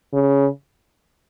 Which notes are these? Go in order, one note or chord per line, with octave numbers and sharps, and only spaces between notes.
C#3